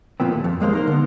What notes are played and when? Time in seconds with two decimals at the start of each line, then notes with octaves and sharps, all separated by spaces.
0.20 A#2 F3 B3 C4
0.32 D#2 A3
0.44 F2
0.60 D#2 G#3 A#3 C5
0.73 D#4 A#4 C5
0.87 D3 B3